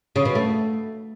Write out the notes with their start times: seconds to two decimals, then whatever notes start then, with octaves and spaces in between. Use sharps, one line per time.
0.16 C#3
0.25 B2
0.35 A3